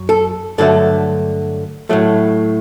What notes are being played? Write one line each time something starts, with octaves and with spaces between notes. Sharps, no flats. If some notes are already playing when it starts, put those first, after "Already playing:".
Already playing: F#2 F#3
A4
G2 D3 F#3 A3 A4
A2 F#3 A3